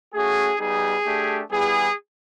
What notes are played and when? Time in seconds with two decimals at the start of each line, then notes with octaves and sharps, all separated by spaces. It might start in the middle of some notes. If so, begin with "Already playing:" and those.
0.15 A3 C#4 F#4 G#4
0.60 G3 B3 D#4 G#4
1.06 A3 D4 G4
1.51 G3 B3 E4 G#4